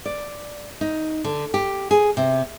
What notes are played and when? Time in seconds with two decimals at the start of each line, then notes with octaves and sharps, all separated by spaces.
0.06 D5
0.81 D#4
1.24 D3
1.54 G4
1.91 G#4
2.17 C3